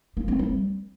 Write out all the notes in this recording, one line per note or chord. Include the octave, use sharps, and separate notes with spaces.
A#3
C4
G3